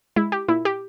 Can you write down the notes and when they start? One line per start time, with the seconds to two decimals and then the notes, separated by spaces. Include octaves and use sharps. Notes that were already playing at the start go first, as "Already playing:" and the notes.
0.16 G#3 E4
0.32 G4
0.49 A#2 E4
0.65 G4